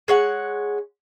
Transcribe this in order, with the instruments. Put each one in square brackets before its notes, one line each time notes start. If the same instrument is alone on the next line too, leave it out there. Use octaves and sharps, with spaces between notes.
[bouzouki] G#3 C#5 F#5